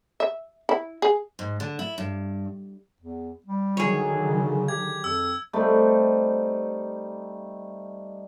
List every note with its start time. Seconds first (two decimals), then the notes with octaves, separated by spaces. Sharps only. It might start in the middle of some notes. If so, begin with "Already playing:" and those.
0.20 E5
0.69 E4
1.02 G#4
1.39 G#2
1.60 D3
1.79 E4
1.98 G2
3.01 E2
3.46 G3
3.77 D3 D#3 F#3 G#4 C#5
4.19 C#3
4.68 G4 G#6
5.04 F2 E6
5.53 G3 A3 C4 D#4